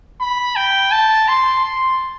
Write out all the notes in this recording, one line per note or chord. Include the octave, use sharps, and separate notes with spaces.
B5
G5
A5
C6
C6